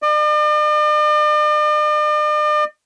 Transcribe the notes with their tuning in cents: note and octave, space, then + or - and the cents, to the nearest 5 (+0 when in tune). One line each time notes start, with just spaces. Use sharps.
D5 +45